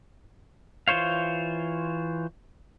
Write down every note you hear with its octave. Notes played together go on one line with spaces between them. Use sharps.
E3 F4 C5 C#5 F5